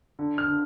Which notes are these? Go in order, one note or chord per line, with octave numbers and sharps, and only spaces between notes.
D3
F6
D3